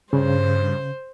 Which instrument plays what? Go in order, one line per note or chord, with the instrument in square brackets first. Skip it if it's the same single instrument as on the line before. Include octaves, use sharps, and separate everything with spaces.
[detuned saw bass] G2 [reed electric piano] C#3 [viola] C5